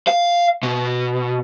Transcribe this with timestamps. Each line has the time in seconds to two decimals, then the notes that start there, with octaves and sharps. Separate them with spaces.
0.07 F5
0.63 B2